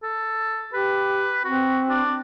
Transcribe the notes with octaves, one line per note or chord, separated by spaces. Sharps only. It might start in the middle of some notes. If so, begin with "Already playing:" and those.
A4
G4 B4
C4 F#4
D4